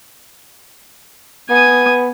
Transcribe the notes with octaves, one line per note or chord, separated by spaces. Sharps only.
B3 G#5 D#6